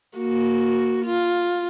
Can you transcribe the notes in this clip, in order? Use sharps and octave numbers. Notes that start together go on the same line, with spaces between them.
A#3 F#4
F4